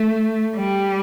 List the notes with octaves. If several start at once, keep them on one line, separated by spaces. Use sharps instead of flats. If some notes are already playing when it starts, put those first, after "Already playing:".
Already playing: A3
G3